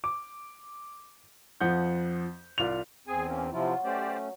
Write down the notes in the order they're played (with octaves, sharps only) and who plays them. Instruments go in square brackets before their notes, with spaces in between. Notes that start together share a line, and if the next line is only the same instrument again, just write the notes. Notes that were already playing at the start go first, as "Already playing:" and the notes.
[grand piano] D6
F2 F3 F#5 G6
C2 F4 D5 F7
[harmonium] E2 C4 [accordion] G#4 G#5
[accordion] A#3 C#4
[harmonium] C3 F3 E4 [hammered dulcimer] F#3 [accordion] F4
[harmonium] A3 C#4 [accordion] G4 C5 D5